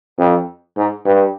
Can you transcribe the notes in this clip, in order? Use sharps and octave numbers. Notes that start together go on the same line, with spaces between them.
F2
G#2
G2